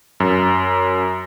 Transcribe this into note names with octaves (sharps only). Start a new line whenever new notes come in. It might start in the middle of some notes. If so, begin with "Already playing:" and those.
F#2